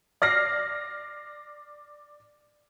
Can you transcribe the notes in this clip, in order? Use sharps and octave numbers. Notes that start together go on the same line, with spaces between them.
D5 F6 A#6 C7